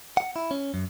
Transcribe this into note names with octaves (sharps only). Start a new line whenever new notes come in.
F#5
E4
C#4
F#2